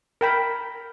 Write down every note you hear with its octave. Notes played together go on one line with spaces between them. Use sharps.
A#4 G5 B5